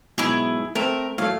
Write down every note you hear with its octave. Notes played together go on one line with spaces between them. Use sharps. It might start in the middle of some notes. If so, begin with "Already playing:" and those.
G#2 B2 F#3 E4 G#4
A3 C4 A#4
A2 F#3 A3 F5